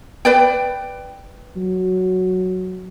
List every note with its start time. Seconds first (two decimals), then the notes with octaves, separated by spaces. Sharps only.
0.25 B4 D5 G5
1.56 F#3